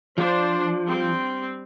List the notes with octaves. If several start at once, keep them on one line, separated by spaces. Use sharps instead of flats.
F3 D4 C5
G3 C4